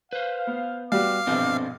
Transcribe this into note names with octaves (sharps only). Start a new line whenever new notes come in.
B4 C5 F5
B3
G3 B3 F#4 F5 D6
A#1 G2 B2 C4 A4 C5